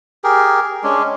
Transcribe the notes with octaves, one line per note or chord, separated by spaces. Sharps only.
G4 G#4 A#4
G#3 C#4 D4